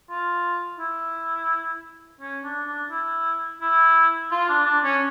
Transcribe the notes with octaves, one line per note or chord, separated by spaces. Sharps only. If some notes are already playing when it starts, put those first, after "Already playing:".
F4
E4
C#4
D4
D4
E4
E4
F4
D4
D4
C#4